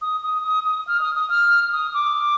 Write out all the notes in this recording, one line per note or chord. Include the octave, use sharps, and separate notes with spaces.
D#6
D#6
D#6
D#6
F6
D#6
D#6
F6
D#6
D6